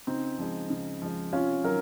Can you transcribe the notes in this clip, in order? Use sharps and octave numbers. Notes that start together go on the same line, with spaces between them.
C#3 C4 D#4
F3 G#3
C#3
F3 G#3
C3 C#4 F4
D#3 F#3 A#4